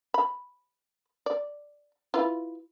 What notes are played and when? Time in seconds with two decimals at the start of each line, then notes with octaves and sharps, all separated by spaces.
0.14 B5
1.26 D5
2.14 E4 F4 B4